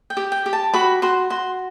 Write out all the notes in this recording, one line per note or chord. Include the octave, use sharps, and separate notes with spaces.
G5
G4
G5
G4
A5
F#4 B5
F#4 C6
F#4 C6